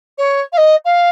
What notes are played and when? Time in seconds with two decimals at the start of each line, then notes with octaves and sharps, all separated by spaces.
0.18 C#5
0.53 F5
0.57 D#5
0.85 F5